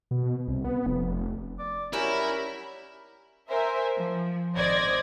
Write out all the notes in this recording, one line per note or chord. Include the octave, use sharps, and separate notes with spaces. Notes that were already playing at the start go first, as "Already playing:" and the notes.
B2
C2
B3
F1
D5
F#3 G3 C#4 E4 A#4
A#4 C5 E5 G#5
F3
G#1 C5 D5 D#5 G#6 A#6